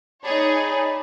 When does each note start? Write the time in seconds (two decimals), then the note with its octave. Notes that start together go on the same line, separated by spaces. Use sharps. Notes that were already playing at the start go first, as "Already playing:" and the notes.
0.24 D#4 G#4 C#5 D5 A5 B5